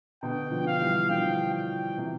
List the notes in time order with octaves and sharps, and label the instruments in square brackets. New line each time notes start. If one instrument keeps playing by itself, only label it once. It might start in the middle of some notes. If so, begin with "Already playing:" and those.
[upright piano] B2 D3 [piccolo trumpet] G5
[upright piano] D3 F3
[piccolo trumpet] F5
[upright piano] E3 G3
[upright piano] D3 F3 [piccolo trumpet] G5
[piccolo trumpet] G5
[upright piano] C3 E3